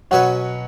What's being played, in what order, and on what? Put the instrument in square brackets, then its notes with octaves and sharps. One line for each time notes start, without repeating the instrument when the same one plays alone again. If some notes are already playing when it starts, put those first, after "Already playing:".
[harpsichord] B2 F#3 C#4 F#4 B4 [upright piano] C#5 F#5